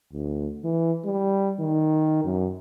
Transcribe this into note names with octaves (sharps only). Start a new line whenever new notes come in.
D2
E3
G3
D#3
F#2